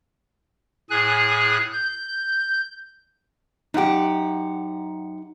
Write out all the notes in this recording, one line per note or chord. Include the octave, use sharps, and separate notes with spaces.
A2 G#4 G#5 F#6
G6
F#2 D#4 G4 F#5